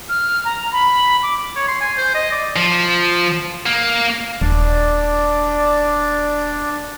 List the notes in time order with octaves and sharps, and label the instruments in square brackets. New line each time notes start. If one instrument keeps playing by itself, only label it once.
[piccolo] F6
A#5
B5
D6
[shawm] C#5
C6
G#5
C5
D#5
D5
[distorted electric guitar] F3
A#3
[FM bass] D#1 [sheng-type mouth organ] D4 D5